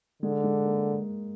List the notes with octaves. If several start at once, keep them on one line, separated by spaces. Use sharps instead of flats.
D3 G#3
G#3
A#3